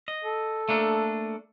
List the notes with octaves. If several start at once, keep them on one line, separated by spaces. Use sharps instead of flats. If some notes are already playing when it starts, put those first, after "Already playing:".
D#5
A4
A3 A#3 D4